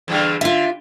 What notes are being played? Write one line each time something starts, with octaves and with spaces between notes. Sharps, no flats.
E2 G2 D3
D3 F4 E5